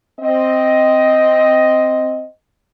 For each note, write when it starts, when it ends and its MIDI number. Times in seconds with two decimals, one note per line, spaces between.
0.20 2.24 60
0.20 2.24 75